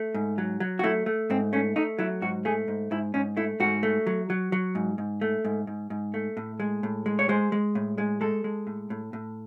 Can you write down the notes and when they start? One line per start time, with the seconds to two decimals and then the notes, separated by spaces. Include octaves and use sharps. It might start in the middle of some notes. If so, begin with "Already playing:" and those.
Already playing: A3
0.14 G#2
0.38 F#3
0.60 F#3
0.79 F#4
0.83 A3 E4
1.06 A3
1.30 G#2 C4
1.53 A3 C#4
1.76 A3 D#4
1.99 F#3 E4
2.22 G#2 F#4
2.45 A3 G#4
2.68 G#2
2.91 G#2 E4
3.14 G#2 C#4
3.37 A3 E4
3.60 G#2 F#4
3.83 A3
4.07 F#3
4.30 F#3
4.52 F#3
4.75 G#2
4.98 G#2
5.21 A3
5.45 G#2
5.67 G#2
5.90 G#2
6.14 A3
6.37 A2
6.60 G#3
6.83 A2
7.06 G#3
7.19 C#5
7.29 G#3 C5
7.52 G#3
7.75 A2
7.98 G#3
8.21 G#3 A4
8.44 G#3
8.67 A2
8.90 A2
9.13 A2